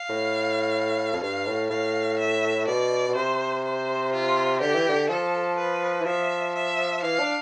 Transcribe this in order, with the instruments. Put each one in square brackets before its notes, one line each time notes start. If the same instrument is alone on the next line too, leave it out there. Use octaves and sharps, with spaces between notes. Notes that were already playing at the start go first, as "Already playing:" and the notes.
Already playing: [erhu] F5
[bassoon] A2
F2
[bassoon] G2 [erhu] F5
[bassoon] A2
[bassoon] A2 [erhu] F5
[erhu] E5
[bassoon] B2 [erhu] D5
[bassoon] B2
[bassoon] C3 [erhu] C5
[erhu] C5
F4
[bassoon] D3 [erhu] G4
[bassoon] E3
D3
[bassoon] F3 [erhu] A4
[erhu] B4
[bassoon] E3
[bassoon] F3 [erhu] E5
[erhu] E5
[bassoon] E3 [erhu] F5
[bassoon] D4